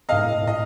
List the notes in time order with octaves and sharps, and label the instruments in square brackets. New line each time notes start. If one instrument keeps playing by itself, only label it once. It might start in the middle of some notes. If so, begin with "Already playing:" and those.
[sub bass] G#2 [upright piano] D#5 F5
[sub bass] A2
A2
[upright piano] D#5